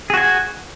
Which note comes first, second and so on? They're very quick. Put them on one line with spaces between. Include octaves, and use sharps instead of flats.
G#4 F#4 G#5 F#5